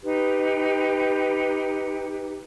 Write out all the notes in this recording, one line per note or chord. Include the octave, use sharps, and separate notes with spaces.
D#4 G4 B4